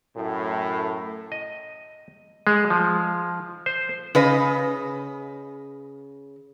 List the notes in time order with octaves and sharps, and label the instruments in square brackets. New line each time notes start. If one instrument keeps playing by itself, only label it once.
[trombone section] F#2 A2
[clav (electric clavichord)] D#5
G#3
F3
C5
[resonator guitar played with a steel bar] C#3 B4 D#5